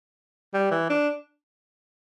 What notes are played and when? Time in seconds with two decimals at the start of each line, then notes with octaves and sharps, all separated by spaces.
0.54 G3
0.71 E3
0.90 D4